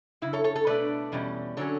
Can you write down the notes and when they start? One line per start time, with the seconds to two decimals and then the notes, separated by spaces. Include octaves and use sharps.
0.22 F#2 C#3 E4
0.33 A4 C#5
0.44 A4 C#5
0.55 A4 C#5
0.67 B2 A3 D4 B4 D5
1.12 E2 B2 G3 C#4
1.57 D3 F#3 C#4 A4 C#5